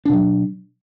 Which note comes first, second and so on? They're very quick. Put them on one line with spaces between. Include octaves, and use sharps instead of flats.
D4 B2 F#3